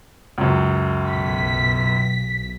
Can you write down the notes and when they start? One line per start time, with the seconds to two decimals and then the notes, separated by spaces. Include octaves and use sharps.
0.38 C#2 F#2
1.09 B1 B6